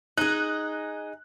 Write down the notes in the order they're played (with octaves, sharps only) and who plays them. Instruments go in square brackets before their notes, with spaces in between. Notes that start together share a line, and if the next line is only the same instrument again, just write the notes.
[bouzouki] D#4 G#4 [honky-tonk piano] F#6